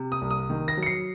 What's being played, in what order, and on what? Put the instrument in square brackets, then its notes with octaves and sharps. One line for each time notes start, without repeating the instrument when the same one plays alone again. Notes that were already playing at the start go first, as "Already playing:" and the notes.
Already playing: [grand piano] C3
D#6
C2
D#6
D#3
A#6
F#3
C#7
C7